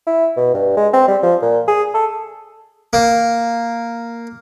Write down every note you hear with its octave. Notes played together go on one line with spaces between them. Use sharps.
E4
B2
G2
G#3
C4
G3
F3
A#2
G#4
A4
A#3